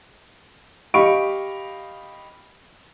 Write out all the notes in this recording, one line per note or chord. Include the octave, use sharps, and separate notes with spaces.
G4 D#5 F5 B5 C#6 D7